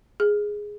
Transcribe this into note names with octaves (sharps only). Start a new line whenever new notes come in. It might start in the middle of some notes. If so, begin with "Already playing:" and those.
G#4